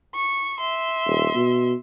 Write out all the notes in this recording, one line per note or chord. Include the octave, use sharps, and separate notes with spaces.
C#6
E5 C6
D#1
B2